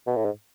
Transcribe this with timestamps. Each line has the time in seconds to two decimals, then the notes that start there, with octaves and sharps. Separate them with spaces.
0.07 B2
0.16 A2
0.25 G#2